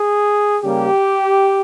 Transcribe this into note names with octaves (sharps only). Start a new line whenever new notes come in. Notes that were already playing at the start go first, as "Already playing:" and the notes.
Already playing: G#4
C#3 G3 A#3 G4